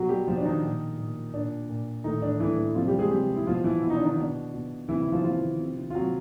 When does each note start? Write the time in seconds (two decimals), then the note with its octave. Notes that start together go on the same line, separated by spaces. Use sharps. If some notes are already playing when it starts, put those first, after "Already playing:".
Already playing: B2 F#3 F#4
0.09 G3 G4
0.27 B2 F3 F4
0.37 D4
0.45 D#3 D#4
0.62 A#2
0.98 A#2
1.34 A#2 D4
1.69 A#2
2.04 A2 D#3 D#4
2.22 E3 D4
2.40 A2 E3 E4
2.58 E3
2.75 C3 F3 F4
2.88 G3 G4
2.94 E3
2.99 G#3 G#4
3.11 C3 G3 G4
3.29 E3
3.36 E4
3.47 B2 F3 F4
3.64 E3 E4
3.82 B2 E4
3.90 D#4
3.96 D4
4.04 D#3 D#4
4.18 B2 D4
4.54 B2
4.88 C3 E3 E4
5.01 E3 E4
5.07 D#3
5.12 F3 F4
5.24 C3 F3 F4
5.42 D#3
5.60 C3
5.78 D#3
5.90 F4
5.95 C3 F#3 F#4